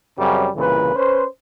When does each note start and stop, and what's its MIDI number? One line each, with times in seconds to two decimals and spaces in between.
0.19 0.47 42
0.19 0.47 49
0.19 0.47 55
0.19 0.47 60
0.19 0.47 61
0.56 0.94 36
0.56 0.94 46
0.56 0.94 49
0.56 0.94 52
0.56 0.94 71
0.95 1.25 61
0.95 1.25 71
0.95 1.25 72